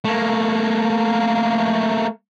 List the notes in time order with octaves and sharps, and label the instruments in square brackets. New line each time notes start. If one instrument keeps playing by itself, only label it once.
[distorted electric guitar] A3 A#3